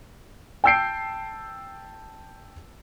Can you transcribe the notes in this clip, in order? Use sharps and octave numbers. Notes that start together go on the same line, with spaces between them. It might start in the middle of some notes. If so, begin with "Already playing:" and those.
G5 A5 E6 G6 C7 D7